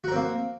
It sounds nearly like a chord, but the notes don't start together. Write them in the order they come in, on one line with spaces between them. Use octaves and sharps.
F#4 A#4 C4 A#3